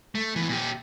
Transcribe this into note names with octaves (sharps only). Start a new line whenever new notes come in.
A3
E2 E3
A#2 G4